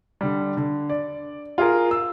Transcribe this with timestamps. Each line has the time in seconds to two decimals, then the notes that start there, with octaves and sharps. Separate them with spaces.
0.21 D3 G3
0.57 D3
0.90 D5
1.58 F4 G#4 A#4
1.91 E6